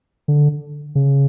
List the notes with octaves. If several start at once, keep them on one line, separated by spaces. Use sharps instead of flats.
D3
C#3